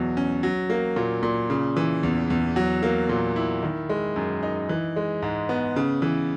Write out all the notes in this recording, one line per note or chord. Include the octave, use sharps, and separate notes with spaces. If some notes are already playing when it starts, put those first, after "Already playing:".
Already playing: E2 B2 F#3
C#4
F#3
A#3
A#2
A#2
C#3
E3
E2
E2
F#3
A#3
A#2
E4
D#3
G#3
F#2
D#4
E3
G#3
G#2
B3
C#3
E3